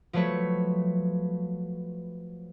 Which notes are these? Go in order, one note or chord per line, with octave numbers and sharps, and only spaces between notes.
F3 F#3 A3 B4 C#5